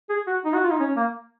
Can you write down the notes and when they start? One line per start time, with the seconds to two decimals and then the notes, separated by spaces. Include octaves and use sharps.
0.10 G#4
0.27 F#4
0.45 D#4
0.54 F#4
0.64 F4
0.71 D#4
0.80 C#4
0.97 A#3